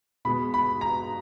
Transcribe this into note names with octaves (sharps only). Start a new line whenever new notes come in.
B2 G#3 B3 B5
B5
A#5